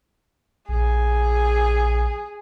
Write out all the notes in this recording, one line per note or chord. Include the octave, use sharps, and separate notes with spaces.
A#1 G#4